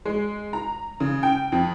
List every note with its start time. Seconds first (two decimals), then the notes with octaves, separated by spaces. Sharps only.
0.05 G#3
0.53 A#5
1.00 C#3
1.23 G5
1.52 F2